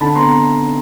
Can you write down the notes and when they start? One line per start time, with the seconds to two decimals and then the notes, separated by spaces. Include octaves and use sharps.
0.01 D3 A5 B5
0.15 B3 A#5 C6